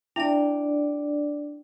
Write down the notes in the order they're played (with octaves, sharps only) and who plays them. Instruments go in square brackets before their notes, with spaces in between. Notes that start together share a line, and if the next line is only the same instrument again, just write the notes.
[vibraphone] D4 D5 [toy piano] E4 E5 A5 [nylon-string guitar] G5